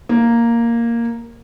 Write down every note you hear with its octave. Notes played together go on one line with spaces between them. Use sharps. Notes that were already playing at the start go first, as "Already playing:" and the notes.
A#3